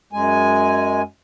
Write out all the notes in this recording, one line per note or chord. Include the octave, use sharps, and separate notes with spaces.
F#2 G#3 G#5